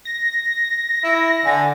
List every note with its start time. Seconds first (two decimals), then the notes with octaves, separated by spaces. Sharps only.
0.05 A#6
1.04 E4
1.45 D3 G#5